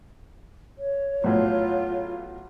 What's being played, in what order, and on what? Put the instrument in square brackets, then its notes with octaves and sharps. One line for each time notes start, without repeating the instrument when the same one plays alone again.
[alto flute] C#5
[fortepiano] B1 A2 [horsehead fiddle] F4